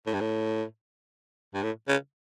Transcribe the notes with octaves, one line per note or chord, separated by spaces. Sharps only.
A2
G2
A2
G2
A2
C#3